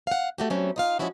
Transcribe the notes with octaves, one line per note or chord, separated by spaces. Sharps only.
F5 F#5
A3 F#4 G4
F#3 G3 A3 C4 C#4
D#4 F4 F5
F3 G#3 C#4 E4 F#4